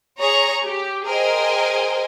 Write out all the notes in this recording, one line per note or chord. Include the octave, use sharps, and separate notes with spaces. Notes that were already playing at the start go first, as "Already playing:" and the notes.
G#4 C#5 A#5 C#6
G4
G#4 A#4 C5 D#5 G5 G#5